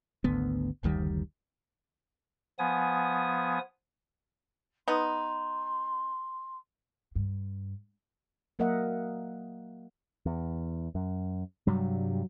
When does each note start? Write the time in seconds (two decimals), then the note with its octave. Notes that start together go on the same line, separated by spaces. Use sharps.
0.24 G#1 D2 D3 B3
0.83 F#1 D2 D#3 G3
2.59 F3 B3 G#5 D#6
4.88 B3 D#4 C6
7.15 G2
8.59 F#3 A#3 A#4 D#5 E5 F#5
10.26 E2
10.95 F#2
11.67 G2 C3 F#3 G3